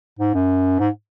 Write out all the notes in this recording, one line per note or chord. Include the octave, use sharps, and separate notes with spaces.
G#2
F#2
G#2